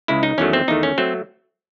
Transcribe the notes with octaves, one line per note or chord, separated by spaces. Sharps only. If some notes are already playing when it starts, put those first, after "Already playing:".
C#2 C#3 G#3 E4
D#4
E2 D#3 F#3 A3 C#4
C4
E2 D#3 A3 D#4
C#4
F#3 A3 C4